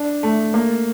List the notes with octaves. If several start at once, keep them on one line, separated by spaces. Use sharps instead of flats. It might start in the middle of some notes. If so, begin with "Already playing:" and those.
Already playing: D4
A3
A#3